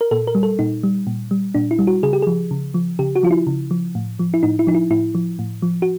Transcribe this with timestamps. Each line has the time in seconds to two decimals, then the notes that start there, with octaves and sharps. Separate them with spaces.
0.01 A#4
0.11 A#2 A4
0.27 A#4
0.35 G3
0.43 A4
0.59 A#2 D#4
0.83 G3
1.07 A#2
1.31 G3
1.54 A#2 D4
1.71 E4
1.79 G3
1.87 F#4
2.03 C#3 G#4
2.13 G4
2.22 F3 G#4
2.51 C#3
2.74 F3
2.99 C#3 G4
3.15 F#4
3.23 F3 F4
3.31 E4
3.47 C#3
3.71 F3
3.95 A2
4.19 F3
4.34 E4
4.43 A2 D#4
4.59 E4
4.67 F3 D#4
4.75 E4
4.91 A2 E4
5.15 F3
5.39 A2
5.62 F3
5.82 F#4